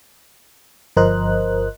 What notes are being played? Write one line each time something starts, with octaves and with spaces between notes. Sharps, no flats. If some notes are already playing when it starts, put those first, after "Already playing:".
G1 F3 A#4 C5 D#5 F#6